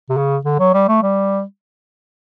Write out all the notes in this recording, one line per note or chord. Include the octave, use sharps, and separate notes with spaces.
C3
C#3
D3
F#3
G3
A3
G3